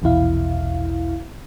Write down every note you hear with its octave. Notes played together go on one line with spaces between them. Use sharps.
A#1 E2 B2 E4 F5